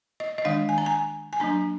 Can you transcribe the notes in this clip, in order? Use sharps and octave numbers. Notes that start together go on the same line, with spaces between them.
D#5
D#5
D#3 G#3 D4 F5
G#5
A#5
G#5
G#5
F#3 A#3 D4 A#5